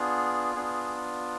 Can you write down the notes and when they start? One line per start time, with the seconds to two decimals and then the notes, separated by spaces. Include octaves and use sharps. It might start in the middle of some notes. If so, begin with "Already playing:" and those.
Already playing: B3 D4 F4 G#4
0.55 B3 D4 F4 G#4